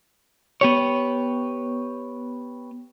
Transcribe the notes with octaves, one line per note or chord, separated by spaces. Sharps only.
B3 G4 C#5